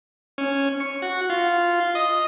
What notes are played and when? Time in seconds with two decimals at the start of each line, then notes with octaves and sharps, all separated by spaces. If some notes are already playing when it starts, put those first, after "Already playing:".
0.38 C#4
0.80 C#6
1.02 F#4
1.30 F4
1.95 D#5